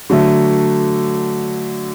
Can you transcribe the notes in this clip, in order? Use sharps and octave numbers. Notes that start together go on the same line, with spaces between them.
D3 F#3 A3